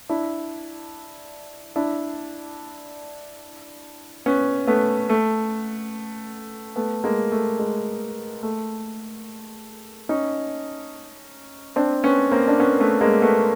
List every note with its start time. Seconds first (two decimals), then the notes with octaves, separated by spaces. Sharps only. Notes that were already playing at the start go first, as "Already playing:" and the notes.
0.09 D4 E4
1.76 D4 E4
4.26 B3 C#4
4.67 A3 B3
5.09 A3
6.76 A3 B3
7.04 G#3 A#3
7.32 A3
7.59 G#3
8.43 A3
10.09 C#4 D#4
11.76 C4 D4
12.04 B3 C#4
12.32 A#3 C4
12.48 D4
12.60 B3 C#4
12.80 A3 B3
13.01 G#3 A#3
13.22 A3 B3